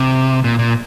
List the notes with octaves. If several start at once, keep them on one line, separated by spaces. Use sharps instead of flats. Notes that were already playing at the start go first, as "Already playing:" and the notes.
Already playing: C3
A#2
A#2